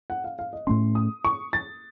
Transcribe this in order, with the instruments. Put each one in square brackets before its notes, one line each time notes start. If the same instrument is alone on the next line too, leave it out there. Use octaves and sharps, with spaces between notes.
[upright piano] F#5
F5
F5
D#5
[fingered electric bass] A2 A3 C#4 [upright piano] C6
[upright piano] D#6
C#6
A6